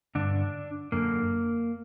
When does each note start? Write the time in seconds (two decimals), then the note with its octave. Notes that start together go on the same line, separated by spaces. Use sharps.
0.15 G2 D3 D4
0.92 F#2 D3 A#3